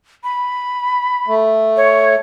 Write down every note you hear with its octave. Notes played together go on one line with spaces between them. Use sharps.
B5
A3
C#5